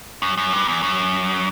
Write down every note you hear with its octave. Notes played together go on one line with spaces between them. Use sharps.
F#2
F#2
G2
E2
F#2